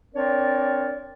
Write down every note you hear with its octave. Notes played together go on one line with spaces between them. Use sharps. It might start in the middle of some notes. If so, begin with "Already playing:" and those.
C4 D4 A#4 C#5 D5